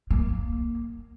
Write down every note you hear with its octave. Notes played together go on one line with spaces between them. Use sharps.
A#3